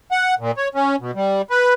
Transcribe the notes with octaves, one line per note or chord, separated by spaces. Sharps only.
F#5
A#2
C#5
C#4
B2
G3
B4